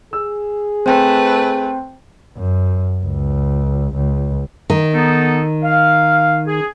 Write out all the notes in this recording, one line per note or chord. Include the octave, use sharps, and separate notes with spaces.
G#4 E6
A3 C4 B4 C5 G5
F#2
C#2
C#2
D#3
B3 D#4 A4
F5
G#4